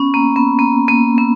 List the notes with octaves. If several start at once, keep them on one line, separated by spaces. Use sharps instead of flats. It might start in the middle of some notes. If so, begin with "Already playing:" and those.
Already playing: B3 C#4
A#3
B3
A#3
A#3
B3